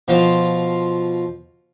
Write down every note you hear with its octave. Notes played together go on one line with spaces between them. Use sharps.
B2 F3 F4